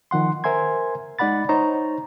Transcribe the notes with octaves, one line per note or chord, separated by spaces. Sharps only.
D#3 F3 F#5 C6
A#4 C5 E5 G#5 C6 G#6
G#3 D#4 D5 F#5 B5 A6
D#4 C5 C#5 A#5